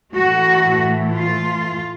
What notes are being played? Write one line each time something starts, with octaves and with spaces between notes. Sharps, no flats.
A2 E3 A3 F#4
F4